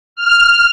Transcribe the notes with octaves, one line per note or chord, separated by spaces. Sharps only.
F6